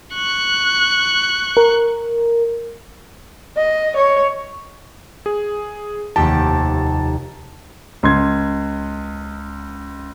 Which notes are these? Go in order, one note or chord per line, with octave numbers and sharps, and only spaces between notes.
C#6 F#6
A#4
D#5
C#5
G#4
F1 D#2 G4 A5
C#2 C6 G#6